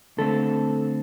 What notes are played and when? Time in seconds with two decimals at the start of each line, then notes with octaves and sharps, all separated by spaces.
0.18 D3 A3 C4 A4